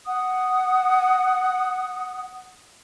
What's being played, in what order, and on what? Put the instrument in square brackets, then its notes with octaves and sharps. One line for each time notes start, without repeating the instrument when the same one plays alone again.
[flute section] F#5 D#6